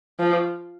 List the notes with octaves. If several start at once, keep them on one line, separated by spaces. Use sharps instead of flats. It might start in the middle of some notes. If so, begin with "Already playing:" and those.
F3